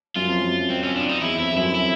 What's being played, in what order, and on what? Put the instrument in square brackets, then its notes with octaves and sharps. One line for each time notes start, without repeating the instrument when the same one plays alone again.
[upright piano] F#2 [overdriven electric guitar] F4
[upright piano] F2
F#2
[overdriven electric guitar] C4
C#4
D4
D#4
[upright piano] E2 [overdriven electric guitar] E4
[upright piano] F2 [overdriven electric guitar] E4
[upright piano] F2
[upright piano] F#2 [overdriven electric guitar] E4
[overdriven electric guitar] E4